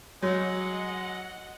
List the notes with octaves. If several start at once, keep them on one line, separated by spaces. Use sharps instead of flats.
F#3 G#3 F#4 C#5 D#5 F#5